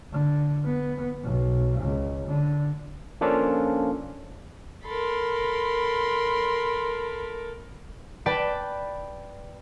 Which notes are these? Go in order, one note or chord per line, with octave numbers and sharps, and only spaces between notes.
D3
B3
B1
C#2
D3
F3 A#3 C#4 D4 F4 A4
A4 A#4 B5 C6
B4 D5 G5 A5